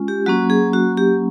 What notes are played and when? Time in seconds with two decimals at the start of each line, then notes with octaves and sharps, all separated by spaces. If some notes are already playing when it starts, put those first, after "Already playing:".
Already playing: G#3 C#4 F4
0.08 G4
0.26 F#3 A#3 C#4 F#4
0.50 G#4
0.73 F#4
0.97 G4